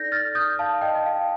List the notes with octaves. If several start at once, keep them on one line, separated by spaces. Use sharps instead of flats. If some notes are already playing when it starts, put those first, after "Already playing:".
Already playing: D#4 A4 D5 G6 A#6
F6 A6
D#6 G6
F5 A5
D#5 G5
D#5
F5